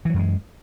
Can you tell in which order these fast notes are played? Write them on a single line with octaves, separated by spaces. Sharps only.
E3 F#3 F#2 G#3